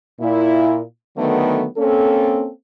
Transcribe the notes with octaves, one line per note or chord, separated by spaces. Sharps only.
A#2 E4
D3 D#3 F#3 A3 B3
A#3 C4 C#4 A4